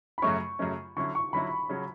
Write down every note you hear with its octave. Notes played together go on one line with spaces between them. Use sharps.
B5
F#2 C#3 F#3 A3 C#4 C#6
F#2 C#3 F#3 A3 C#4
D3 F#3 C#4 E4 C#6
C#6
D3 F#3 C#4 E4 B5
C#3 F#3 C#4 F#4